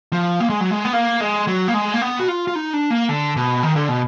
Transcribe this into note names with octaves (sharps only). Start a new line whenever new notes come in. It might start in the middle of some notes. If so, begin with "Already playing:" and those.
F3
A#3
G#3
F#3
G#3
B3
A#3
G#3
F#3
A#3
G#3
A#3
B3
F#4
F4
F4
D#4
D4
A#3
D3
B2
D#3
D3
B2